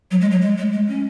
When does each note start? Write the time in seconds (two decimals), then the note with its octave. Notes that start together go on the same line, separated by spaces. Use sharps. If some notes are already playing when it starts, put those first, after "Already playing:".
0.11 F#3
0.21 G#3
0.31 F#3
0.41 G#3
0.58 G#3
0.72 G#3
0.89 C#4